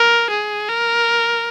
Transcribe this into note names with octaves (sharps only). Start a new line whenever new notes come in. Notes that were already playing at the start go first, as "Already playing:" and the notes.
Already playing: A#4
G#4
A#4